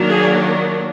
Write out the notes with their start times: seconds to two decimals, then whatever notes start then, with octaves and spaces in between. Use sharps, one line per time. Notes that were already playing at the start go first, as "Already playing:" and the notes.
Already playing: D#3 F#3 A#3 D4
0.09 G#4